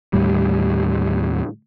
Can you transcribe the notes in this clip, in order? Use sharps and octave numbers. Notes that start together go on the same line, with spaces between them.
D#2 A2 G3